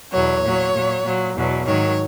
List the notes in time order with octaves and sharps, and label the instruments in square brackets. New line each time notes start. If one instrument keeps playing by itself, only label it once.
[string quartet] E2 B2 F#3 C#5
A#2 F#3
A#2 F#3
A#2 F#3
E2 B2 F#3
G#2 D#3 F#3 C#5